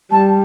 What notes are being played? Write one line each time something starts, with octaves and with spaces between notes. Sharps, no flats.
G3 A5